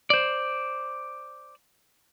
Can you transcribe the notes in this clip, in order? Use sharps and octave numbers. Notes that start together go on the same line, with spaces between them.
C5 D5